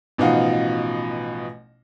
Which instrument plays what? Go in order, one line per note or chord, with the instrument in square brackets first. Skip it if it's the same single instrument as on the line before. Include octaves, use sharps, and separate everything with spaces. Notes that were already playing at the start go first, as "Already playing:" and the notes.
[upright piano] A1 B2 F3 D#4 F5 F#5